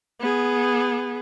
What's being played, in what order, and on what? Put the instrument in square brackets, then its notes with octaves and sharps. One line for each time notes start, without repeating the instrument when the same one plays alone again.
[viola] B3 G#4